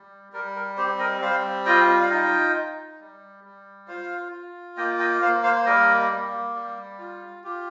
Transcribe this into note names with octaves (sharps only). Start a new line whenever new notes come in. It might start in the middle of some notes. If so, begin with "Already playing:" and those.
Already playing: G3
G3 A#4
A#4
C4 G4 C5
A#4 D#5
G3 C5 F5
F4 D#5 G5
F5
D#4 D#5 G5
D#4
G3
G3
F4 C5 F5
F4
A#3 D#5 G5
D#5 G5
A#3 C5 F5
C5 F5
C5
G3 A#4 D#5
A#3
G3
F4
F4 G4